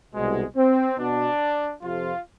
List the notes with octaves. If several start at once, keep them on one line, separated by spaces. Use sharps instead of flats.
C2 B2 G#3
C4
B2 B3 D4
F2 C3 F3 F4